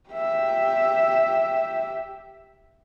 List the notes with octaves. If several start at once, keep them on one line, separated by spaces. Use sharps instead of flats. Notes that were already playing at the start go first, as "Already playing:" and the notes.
G4 E5